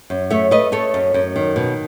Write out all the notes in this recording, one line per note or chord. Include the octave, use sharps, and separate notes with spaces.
F#2
A3 C#5 E5
A3 B4 D#5
A3 A4 C#5
F#2
F#2
D#3
B2